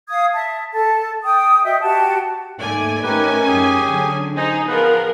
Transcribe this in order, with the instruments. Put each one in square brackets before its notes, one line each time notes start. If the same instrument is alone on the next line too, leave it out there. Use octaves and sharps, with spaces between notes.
[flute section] F5 D#6 G#6
E5 A5
A4 A5
G5 D#6
F#4 D#5 E5 G5
F#4 G4 A5
[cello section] D#2 G#2 D5 [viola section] A3 G#5
[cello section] A3 D#4 A#4 [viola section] C#4 G#5 [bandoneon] G4 B4
[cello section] F#2 [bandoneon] G4 G#4
[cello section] D3 F#3 D4
[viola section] D#4 [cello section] G#4 [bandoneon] C5 D#5 G#5
[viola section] F3 A#4 [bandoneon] B3 B4